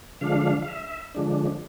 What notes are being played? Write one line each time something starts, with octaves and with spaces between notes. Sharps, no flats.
D3 F3 G#3 D4 F5
F5
E5
D3 F3 G#3 D4